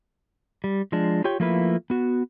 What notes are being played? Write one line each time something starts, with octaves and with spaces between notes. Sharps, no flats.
G3
F3 G#3 D4
F4 G4 C#5 G5
F3 A3 A#3 E4 F4 B4
B3 F#4